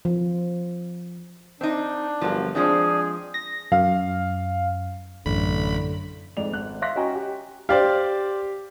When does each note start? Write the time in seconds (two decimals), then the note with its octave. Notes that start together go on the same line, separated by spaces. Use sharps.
0.05 F3
1.61 C4 D4 D#4
2.21 G1 F3 F#3 A#3
2.55 F3 G#3 C4 D4 G#4
3.34 A#6
3.72 F#2 F5
5.26 A1 F#2 D3 B5
6.37 F2 G#2 D5 F7
6.53 G#1 F#6
6.82 E5 F5 C6 F#6 A#6 B6
6.96 C#4 F#4 D#5 G5 G#5 A#5
7.15 G4
7.69 G4 C5 D5 F5